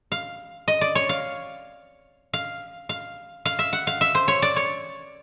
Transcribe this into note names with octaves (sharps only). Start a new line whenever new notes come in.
F5
D#5
D5
C#5
F5
F5
F5
F5
E5
F#5
F5
E5
C5
C#5
D5
C#5